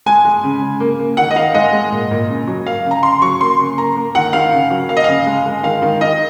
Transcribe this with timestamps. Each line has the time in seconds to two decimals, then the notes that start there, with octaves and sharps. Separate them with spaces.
0.06 G#3 G#5
0.25 G#3
0.43 C#3
0.62 C#3
0.80 A#3
1.00 A#3
1.17 D#3 F#5
1.31 D#5
1.36 D#3 F5
1.54 G#3 D#5
1.73 G#3
1.92 A#2
2.11 A#2
2.29 C#3
2.47 F#3
2.66 A#3 F5
2.85 C#3
2.91 A#5
3.03 C#3 C6
3.22 F#3 C#6
3.41 A#3 C6
3.59 C#3
3.78 A#3 A#5
3.97 A#3
4.15 D#3 F#5
4.33 D#3 F5
4.53 C#3
4.70 F#3
4.89 A#3 F5
4.97 D#5
5.04 C#3 F5
5.27 G#3
5.46 G#3
5.63 D#3 F5
5.82 D#3
6.01 D#3 D#5